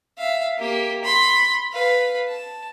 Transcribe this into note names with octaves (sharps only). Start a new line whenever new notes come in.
E5 F5
A#3 G4
B5 C6
B4 F5
A5